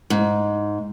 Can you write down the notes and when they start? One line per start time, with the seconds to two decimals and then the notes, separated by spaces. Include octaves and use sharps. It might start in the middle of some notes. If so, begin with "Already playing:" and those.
0.10 G#2